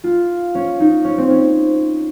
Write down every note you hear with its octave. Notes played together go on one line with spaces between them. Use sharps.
F4
C#4
D#4
C#4
C4
C#4